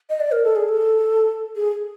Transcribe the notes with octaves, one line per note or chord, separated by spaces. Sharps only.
D#5
D5
A#4
A4
G#4
A4
G#4